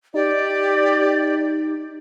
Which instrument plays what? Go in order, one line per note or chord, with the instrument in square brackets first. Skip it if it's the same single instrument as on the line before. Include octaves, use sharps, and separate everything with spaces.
[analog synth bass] D#4 [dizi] G4 [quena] D5